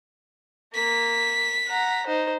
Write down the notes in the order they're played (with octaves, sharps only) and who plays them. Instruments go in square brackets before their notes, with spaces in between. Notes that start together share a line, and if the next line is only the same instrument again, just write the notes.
[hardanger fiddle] A#3 [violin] B6
[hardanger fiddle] F#5 A#5
D#4 C5